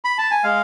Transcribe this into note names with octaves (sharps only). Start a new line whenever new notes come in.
B5
A5
G#5
G#3 F5